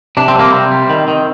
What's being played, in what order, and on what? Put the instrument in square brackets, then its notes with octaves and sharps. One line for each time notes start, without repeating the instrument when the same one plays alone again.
[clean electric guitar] C3 D4
C4
G3 A#3
C3 C4
G3
D#3
D#3